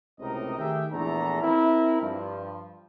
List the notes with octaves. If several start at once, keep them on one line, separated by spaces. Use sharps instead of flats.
C#2 A2 C3 D#4 A#4 D#5
D#3 A3 G4 G#4 E5 G5
A#1 E2 E3 A3 D4 A#5
C4 E4 A#4
G2 F3